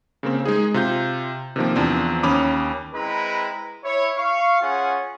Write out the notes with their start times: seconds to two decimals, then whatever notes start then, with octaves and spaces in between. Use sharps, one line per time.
0.23 C#3 A#3 C4
0.45 G#3 D#4 G#4
0.74 C3 F4 G6
1.56 C3 D#3 F3 A#3
1.75 E2 F3 C4 D4
2.23 D#2 C#4 B5 D6 D#6
2.94 G#3 C4 E4 B4 A#5
3.83 E4 C#5
4.17 F5 C#6
4.61 C#4 F4 G#4 F#5 G#5